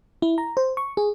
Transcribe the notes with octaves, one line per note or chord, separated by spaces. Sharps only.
E4
A#5
C5
C#6
G#4